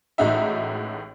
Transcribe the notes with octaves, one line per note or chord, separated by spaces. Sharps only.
A1 A2 G#3 D#4 F#4 E5